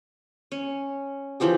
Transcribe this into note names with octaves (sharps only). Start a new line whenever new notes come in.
C#4
E3 F3 G4 G#4